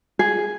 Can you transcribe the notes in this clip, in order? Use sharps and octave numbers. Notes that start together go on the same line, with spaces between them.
G#4